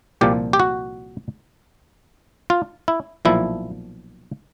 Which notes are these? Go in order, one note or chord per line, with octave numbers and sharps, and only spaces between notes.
C2 A#2 F3 G4
G4
F#4
F4
E4
B1 A#2 F3 E4